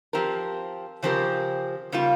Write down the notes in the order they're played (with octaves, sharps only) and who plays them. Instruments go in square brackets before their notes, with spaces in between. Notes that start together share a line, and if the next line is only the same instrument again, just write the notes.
[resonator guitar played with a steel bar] F3 C4 G4 A#4
C#3 F3 C4 G4 A#4
C#3 G3 A#3 F4